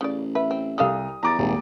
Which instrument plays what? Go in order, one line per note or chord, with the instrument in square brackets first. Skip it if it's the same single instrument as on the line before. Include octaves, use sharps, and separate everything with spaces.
[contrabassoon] A1 [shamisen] C#3 D5
[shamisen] B4 [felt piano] E5
[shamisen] C4
[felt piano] C2 D#6 [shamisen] G3 A4 F5
[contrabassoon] E2 [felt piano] A#5 D6 A6
[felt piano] D#1 [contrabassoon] G#1